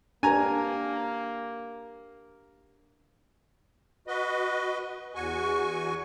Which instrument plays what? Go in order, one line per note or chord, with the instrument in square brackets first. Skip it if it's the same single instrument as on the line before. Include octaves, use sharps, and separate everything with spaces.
[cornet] A#3 [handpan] D4 G4 A#4 [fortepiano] G#5 A#5
[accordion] F#4 B4 D#5
E2 F#4 G#5 C#6